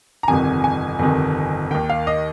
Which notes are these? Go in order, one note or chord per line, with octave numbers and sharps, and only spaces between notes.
A#5
G1 F2 C3 D#3 G#5
G#5
G1 F2 C3 D#3
D#2 D#3 G5
F5
D#5